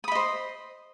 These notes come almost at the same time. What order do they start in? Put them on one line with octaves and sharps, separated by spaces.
D#6 B5 D#5 C5